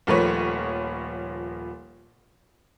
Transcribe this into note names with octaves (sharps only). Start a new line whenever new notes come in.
D#1 F3 A3 A#4 B4 C#5